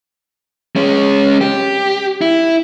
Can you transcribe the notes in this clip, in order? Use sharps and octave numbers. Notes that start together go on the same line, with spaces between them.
G#3 C#4
G4
E4